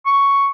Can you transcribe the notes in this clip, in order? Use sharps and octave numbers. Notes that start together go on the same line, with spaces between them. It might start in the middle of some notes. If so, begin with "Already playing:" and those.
C#6